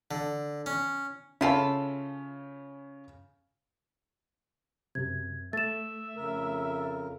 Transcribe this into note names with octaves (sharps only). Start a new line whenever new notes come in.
D3
C#4
C#3 C#4 E4 F4 A4
F#2 C3 G#6
A3 E5 A6 E7
F2 C#3 A#4